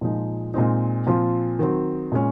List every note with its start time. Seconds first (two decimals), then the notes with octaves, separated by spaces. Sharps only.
0.01 A#2 F3 G#3 D#4
0.54 A#2 G#3 C4 D#4
1.07 A#2 F3 C4 F4
1.59 D#3 F#3 C4
2.12 A#2 G#3 C#4